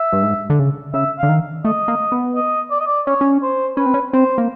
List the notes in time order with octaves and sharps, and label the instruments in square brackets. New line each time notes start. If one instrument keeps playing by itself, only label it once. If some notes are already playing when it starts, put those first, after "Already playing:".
Already playing: [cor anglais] E5
[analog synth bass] G2
G#2
D3
C#3
[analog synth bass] C#3 [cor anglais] E5
[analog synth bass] D3 [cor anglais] F5
[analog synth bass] D#3
[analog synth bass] A3 [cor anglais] D#5
[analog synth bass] A#3
B3
[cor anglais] D#5
D5
D#5
D5
[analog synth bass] C#4 [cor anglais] C#5
[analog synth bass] C#4
[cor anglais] C5
[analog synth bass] C#4 [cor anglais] B4
[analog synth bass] C4
C#4
[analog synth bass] C4 [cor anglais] C5
[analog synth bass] A#3